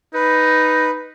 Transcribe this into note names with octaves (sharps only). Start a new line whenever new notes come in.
D#4 B4